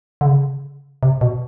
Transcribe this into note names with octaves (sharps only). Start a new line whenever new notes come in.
D3
C#3
C3
B2